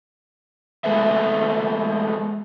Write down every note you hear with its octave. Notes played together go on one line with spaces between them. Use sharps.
G#3 A3 B3 E5